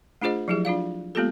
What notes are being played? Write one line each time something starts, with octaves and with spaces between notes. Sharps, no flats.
A3 D4 F4 G#4 C5 D#5
F3 F#3 E4 G4 G#4
D4 F4 D5 F5
G#3 A#3 B3 F4 G4 A4